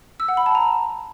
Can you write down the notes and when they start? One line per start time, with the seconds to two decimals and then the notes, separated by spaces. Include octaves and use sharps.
0.20 E6
0.28 F#5
0.37 B5
0.46 A5
0.55 A#5